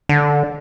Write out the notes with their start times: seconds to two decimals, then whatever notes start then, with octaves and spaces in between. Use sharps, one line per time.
0.09 D3